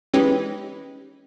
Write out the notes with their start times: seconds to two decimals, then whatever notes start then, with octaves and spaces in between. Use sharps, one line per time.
0.14 E3 G#3 C#4 D#4 G4 B4